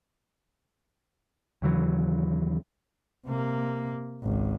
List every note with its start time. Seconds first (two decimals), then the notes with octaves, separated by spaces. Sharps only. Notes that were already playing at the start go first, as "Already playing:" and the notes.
1.62 D#2 C#3 E3 F#3
3.26 C3 A#3
4.22 G#1 C#2